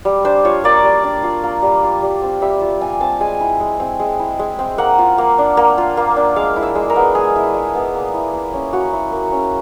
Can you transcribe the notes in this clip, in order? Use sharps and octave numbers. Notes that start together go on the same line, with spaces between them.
G3
D4 C5
F4 C#5
A#3 D5
G3
D4
F4
A#3
G3
F4
G3
C4
G3 E5
F4
G3 G#5
C4 A5
G#3 G#5
E4
G#3
C4
G#3
E4
G#3
C4
A#3 F#5
F4
A#3
D4
A#3
F4
A#3
D4
G#3 F5
E4
E5
G#3
A#4
B3
G#3 G#4
E4
G#3
B3
A#3
E4
A#3
C#4
A#3 F#4
E4
A#3
C#4